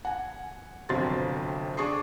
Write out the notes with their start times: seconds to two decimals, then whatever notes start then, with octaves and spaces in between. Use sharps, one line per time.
0.05 F#5 G#5
0.89 G1 F2 C3 F#3 C6 A6
1.77 D4 G#4 C#6 D#6 C7